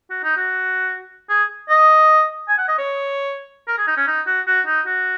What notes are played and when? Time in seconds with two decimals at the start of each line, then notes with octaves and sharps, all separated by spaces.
0.10 F#4
0.24 D#4
0.37 F#4
1.29 G#4
1.70 D#5
2.48 G#5
2.58 F#5
2.68 D#5
2.78 C#5
3.68 A#4
3.78 G#4
3.87 D#4
3.97 C#4
4.07 D#4
4.27 F#4
4.47 F#4
4.67 D#4
4.86 F#4